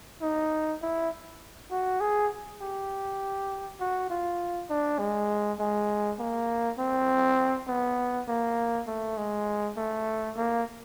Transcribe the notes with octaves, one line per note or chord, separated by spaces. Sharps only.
D#4
E4
F#4
G#4
G4
F#4
F4
D4
G#3
G#3
A#3
C4
B3
A#3
A3
G#3
A3
A#3